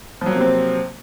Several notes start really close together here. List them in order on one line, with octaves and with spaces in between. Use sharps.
F3 F#3 A#3 C3 C4